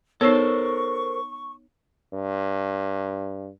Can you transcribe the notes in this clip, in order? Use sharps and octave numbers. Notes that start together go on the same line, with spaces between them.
B3 D#4 A4 A#4 C5 C#5 C#6 E6
G2